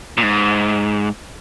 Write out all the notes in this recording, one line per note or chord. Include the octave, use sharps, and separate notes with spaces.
A#2
G#2